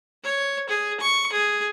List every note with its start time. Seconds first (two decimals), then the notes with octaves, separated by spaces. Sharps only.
0.23 C#5
0.69 G#4
1.00 C#6
1.33 G#4